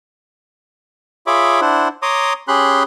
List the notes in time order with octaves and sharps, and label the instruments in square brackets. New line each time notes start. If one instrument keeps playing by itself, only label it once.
[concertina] F4 G#4 C#5 E5 B5 D6
D4 E4 C5 F#5
C#5 A#5 C6 D6 D#6
C#4 G4 G#4 B5 C6 F#6